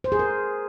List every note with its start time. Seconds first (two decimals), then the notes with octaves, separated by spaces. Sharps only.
0.04 C5
0.12 G#4
0.19 A#4